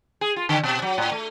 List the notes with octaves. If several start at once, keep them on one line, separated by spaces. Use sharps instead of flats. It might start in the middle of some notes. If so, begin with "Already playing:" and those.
G#4
F4
D3
B2
F#3
A2
A3